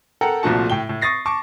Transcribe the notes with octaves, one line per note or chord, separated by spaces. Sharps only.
A4 A#4 F#5 G5 A#5
C2 A#2 F3 A3 F#4 A5
A2 G5 G7
A2
C#6 D#6 A6 A#6 C7
A5 C#6 D6